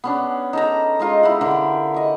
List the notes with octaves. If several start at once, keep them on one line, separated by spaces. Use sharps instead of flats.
B3 C#4 D4
D#4 A4 A#5
G#3 D#4 F4 D#5
E4 G4 F#5
D3 A#4 B5
D#5 C#6